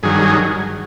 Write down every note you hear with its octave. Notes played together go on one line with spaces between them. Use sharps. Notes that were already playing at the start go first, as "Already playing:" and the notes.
G2 D#3 F#3 G#4